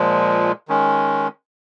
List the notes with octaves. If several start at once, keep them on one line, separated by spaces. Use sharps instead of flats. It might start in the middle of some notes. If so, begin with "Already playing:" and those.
Already playing: A#2 F3 G#3
D#3 G#3 C#4